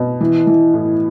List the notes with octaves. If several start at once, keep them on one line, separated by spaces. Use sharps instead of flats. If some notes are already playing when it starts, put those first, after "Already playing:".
Already playing: B2
E3
E3
A2